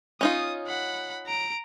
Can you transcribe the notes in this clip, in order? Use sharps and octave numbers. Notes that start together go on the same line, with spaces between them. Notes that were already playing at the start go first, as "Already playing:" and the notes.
C#4 D#4 F4 D#6
F#5 B5
A#5 D7